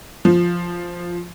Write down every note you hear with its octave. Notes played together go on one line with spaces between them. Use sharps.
F3